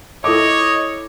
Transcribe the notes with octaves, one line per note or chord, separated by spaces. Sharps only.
E4 A4 C#5 D#5 D6